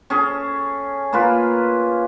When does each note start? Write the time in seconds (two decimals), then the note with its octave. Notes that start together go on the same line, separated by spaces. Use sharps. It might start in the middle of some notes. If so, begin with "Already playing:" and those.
0.10 C#4 G#4 A4
1.13 A#3 F4 B4